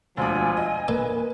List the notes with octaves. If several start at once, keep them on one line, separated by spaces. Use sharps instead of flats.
E1 D2 F3 D4 G#5
D#5
A#3 A4 B4 D5